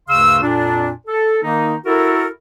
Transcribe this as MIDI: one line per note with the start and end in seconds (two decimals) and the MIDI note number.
0.09 0.39 38
0.09 0.39 43
0.09 0.39 49
0.09 0.39 77
0.09 0.39 84
0.09 0.39 88
0.42 0.90 41
0.42 0.90 46
0.42 0.90 62
1.07 1.37 69
1.42 1.74 51
1.42 1.74 58
1.42 1.74 63
1.85 2.26 64
1.85 2.26 66
1.85 2.26 69
1.85 2.26 70